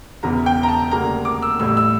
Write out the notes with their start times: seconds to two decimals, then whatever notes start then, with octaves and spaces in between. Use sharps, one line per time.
0.23 E1 E2 C#3 E3 A#5
0.46 G5
0.63 A#5
0.68 A5
0.91 E1 D2 C#3 G3 A#3 A#5
1.25 D6
1.42 E6
1.59 A1 A2 G3 E6
1.77 E6